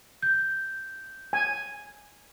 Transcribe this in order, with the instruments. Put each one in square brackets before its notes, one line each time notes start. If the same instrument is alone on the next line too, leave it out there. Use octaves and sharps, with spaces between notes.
[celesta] G6
[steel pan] G#5